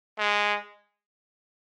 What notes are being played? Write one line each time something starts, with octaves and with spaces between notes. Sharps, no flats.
G#3